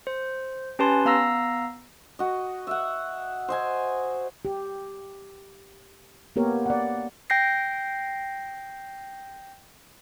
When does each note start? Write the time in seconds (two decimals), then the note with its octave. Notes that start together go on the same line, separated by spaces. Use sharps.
0.07 C5
0.79 C#4 G4 B4 G#5 A5 C6
1.05 B3 F5 A#5 E6 A#6
2.19 F#4 D#5
2.67 E5 F#5
3.49 C5 D#5 G#5
4.45 G4
6.36 A#3 B3 G4 A#4 C#5
6.66 D5 F#5
7.30 G5 G6 A#6 C7